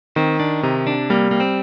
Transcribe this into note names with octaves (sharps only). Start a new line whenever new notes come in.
D#3 C4
D4
C3 D#4
D4
G3 A#3
A#3
C4